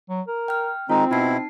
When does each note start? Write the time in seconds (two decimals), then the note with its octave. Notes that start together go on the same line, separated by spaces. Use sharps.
0.09 F#3
0.28 A#4
0.48 G5 F6
0.90 D#3 G#3 C4 D#4 F4
1.11 B2 D#4 E4 A5 C7